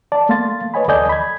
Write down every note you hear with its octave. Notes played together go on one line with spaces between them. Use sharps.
D5 A5
A3 A#3 F5 C6 A6
B4 C#5 D#5 G#5 B5
D2 A4 D5 D#5 G#5 G6
B5 G#6